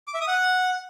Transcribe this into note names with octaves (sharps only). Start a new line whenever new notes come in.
D6
E5
D#6
F#5